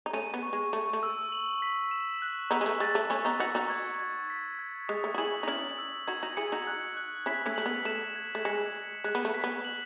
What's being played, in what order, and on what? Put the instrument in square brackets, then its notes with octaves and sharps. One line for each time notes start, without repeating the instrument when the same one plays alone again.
[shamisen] D#4
[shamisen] A3 C#4 [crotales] D#7
[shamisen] B3
[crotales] C#6
[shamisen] G#3
[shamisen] A3 [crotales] C#6
[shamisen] A3
[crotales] E6
F#7
B6
E7
F#6
[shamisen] B3 D#4 [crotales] E6
[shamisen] G#3
A3
[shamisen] G#3 [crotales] A6
[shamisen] A3
[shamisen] A3 C#4 [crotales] C#6
[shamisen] B3 D#4
[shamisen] D#4 F#4 [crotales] C#7
[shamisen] D#4 F#4
[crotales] G#6
G#6
B6
G#6
[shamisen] G#3 [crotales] D#6
[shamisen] A3
F#4
[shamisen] E4 G#4 [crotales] F#7
[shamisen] D#4
[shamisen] C#4 E4 [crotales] F#7
[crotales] E6
[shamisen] D#4 F#4 [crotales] G#6
[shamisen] D#4 F#4
[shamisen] E4 G#4 [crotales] C#7
[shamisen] D#4 F#4
[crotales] F#6
F#6
[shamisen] C#4 E4 [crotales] B6
[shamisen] A3 C#4
[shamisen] A3 [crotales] F#7
[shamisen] B3
[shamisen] A3 [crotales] E7
[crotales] G#6
[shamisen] A3
[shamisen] G#3 [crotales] C#7
[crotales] C#7
[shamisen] G#3 [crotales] F#6
[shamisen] B3
A3
[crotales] B6
[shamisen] B3
[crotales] F#7